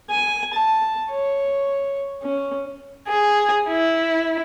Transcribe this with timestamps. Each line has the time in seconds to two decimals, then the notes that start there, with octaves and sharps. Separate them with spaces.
0.10 G#5
0.54 A5
1.11 C#5
2.23 C#4
3.08 G#4
3.70 E4